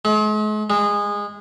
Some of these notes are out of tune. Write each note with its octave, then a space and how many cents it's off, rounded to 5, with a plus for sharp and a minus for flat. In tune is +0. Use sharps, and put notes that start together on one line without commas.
G#3 +45
G#3 -20